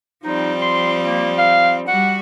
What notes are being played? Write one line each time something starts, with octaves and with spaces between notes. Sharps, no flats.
F3 G3 C4 D#4
C6
A#3
F5
G3 F#4 F#5